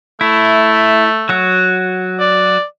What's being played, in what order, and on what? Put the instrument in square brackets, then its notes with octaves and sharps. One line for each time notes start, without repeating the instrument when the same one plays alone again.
[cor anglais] A3 [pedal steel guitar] E4
[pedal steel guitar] F#3 F#4
[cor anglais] D5